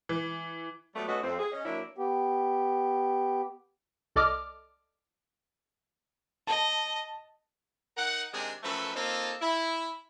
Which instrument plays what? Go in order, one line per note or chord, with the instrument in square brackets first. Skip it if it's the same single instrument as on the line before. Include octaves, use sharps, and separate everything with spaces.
[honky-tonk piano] E3
[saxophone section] F#3 G3 A3 B3
A3 C#4 F#4 B4 C#5 D#5
F2 C4
G#4
C#4 D#5
F#3 A#3 D4 E4 A#4 C#5
[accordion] B3 G4
[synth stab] C2 A4 D5 D#5 D6 F6
[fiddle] D#5 [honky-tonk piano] A5
[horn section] D#4 A#4 F#5
C3 D#3 G#3 D4 G#4
F#2 F3 A3 A4 B4
A#3 C4 D#4 F4 A4
E4